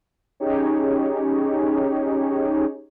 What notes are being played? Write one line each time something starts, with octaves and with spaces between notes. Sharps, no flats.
C#4 D#4 G4 G#4 C#5